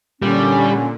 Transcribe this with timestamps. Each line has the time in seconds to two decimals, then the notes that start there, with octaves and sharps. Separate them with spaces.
0.22 A#2 D3 G3 C#4